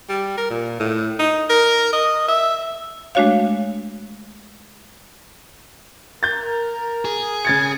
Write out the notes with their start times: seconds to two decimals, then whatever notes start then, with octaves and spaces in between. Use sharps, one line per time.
0.09 G3
0.38 A#4
0.50 A#2
0.80 A2
1.19 D#4
1.49 A#4
1.93 D#5
2.28 E5
3.15 G#3 A3 D4 F#4 C#5 F5
6.23 A#4 G6 A6
7.05 G#4
7.45 C#3 G#6 A6 C#7